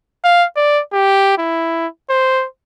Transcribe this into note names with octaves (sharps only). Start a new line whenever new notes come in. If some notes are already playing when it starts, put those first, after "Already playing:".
F5
D5
G4
E4
C5